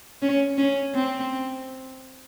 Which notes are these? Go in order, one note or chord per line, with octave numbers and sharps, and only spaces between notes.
C#4
C#4
C4